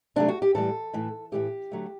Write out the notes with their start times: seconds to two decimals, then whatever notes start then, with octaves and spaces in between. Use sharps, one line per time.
0.16 C3 F#3 A3 D4
0.28 F#4
0.42 G4
0.54 A2 E3 G3 A4
0.93 A2 E3 A3
1.32 A2 E3 A3 G4
1.72 D3 F#3 A3